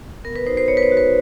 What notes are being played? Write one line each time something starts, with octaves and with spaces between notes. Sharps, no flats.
B3 A#4
B4
D#4 F#4 C5
C5
B3 C#5
B4
C5
D#4 F#4
B4